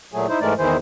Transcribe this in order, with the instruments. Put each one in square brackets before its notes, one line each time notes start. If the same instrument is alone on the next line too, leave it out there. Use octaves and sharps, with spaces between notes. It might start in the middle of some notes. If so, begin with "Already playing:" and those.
[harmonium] A#2 F#3 A3 G#4
D#4 E4 C5
G#2 E3 G#3 A3 A#4 D5
E2 D#3 E3 E4 G#4 C5